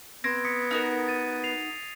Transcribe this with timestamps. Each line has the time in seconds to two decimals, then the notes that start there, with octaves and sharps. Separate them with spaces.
0.24 B3 C4 G#6 A#6 D7
0.45 D#6 B6 C#7
0.71 D#4 F#4 A#4
1.08 A6 D#7
1.44 C7 F7